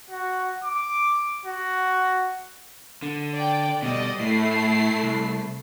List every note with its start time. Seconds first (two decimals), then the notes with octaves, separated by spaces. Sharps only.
0.11 F#4
0.64 D6
1.46 F#4
3.02 D3
3.34 D5 G5
3.82 B2 G3 D5 D#5
4.20 A2 A3 E4 C7
5.03 C2